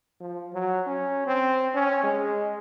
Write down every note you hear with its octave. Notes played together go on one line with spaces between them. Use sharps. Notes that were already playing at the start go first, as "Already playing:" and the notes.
F3
F#3
C#4
C4
C#4
G#3